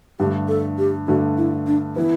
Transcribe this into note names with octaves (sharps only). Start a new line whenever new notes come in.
G2 D3 A3 G4
A4
G4
G2 D3 A3 F#4
E4
D4
E3 B3 E4